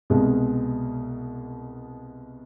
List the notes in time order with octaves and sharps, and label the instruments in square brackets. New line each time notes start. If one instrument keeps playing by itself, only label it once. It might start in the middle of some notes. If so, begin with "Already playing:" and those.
[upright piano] C2 B2 G#3